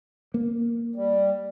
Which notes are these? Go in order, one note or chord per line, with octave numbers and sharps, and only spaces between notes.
A#3
G3